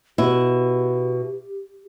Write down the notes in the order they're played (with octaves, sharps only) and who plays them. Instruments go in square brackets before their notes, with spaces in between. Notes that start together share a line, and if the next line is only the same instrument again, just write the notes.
[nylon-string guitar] B2 E4 [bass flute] G4